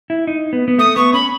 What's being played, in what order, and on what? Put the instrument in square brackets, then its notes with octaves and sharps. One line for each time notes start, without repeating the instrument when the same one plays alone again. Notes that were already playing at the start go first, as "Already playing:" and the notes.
[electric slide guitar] E4
D#4
B3
B3
[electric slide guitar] A3 [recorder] D#6
[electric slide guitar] B3 [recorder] C#6
[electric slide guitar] C#4 [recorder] B5